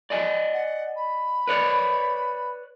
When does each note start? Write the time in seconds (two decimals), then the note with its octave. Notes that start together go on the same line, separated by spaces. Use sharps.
0.10 D5 D#5 G#5
0.54 F#5
0.96 B5
1.47 B4 C#5 D5